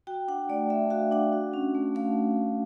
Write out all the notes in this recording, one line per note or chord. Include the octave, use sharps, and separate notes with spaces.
F#4 G5
D4 F#5
A3 D5
A3 E5
F#4 F5
D4 F#5
F#4
C#4
A3
A3 F5